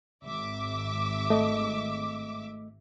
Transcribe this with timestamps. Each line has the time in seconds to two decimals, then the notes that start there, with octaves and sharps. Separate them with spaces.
0.23 G#1 E5 D6
1.30 A3 D#5